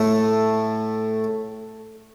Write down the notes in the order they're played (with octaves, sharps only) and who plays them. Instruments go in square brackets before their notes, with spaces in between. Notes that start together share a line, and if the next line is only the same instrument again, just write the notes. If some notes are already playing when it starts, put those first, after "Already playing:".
Already playing: [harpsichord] A2 A3